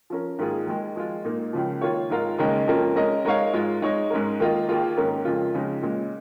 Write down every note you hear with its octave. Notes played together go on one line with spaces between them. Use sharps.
F3 C#4 A#4
G#2 D#3 A#3 F4 G#4
D#2 D#3 G#3
F3 G#3 F4
A#2 A#3 D#4
C#2 C#3 F3
D#3 A#3 F4 C#5
G#2 G#3 F4 A#4 F5
D#2 C#3 G#3 D#4 A#4
F2 F3 A#3 C#4 A#4
G#3 C#4 A#4 D#5
G#3 D#4 A#4 C#5 F5
G#2 G#3 F4
G#3 D#4 C#5
G#2 G#3 C#4 A#4
D#3 A#3 F4 A#4 D#5
D#2 D#3 A#3 F4 G#4
G#2 D#3 A#3 C#4 A#4
F2 C#3 G#3 F4
C#2 C#3 F3 G#3 D#4
A#2 G#3 C#4